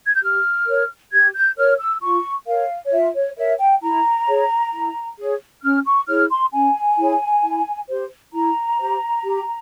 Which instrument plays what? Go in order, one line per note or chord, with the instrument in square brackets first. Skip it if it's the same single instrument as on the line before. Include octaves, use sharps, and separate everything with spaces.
[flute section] G#6
G6
G4 F6
A#4 C#5
G4 G#6
G6
A#4 C#5 F6
E6
F4 C#6
A#4 C#5 F5
C#5
F4 E5
C#5
A#4 C#5 E5
G5
E4 A#5
G#4 C#5
E4
G#4 C#5
C#4 F6
C#6
E4 G#4 C#5 F6
C6
C#4 G#5
E4 G#4 C#5
E4
G4 C5
E4 A#5
G4 C5
G4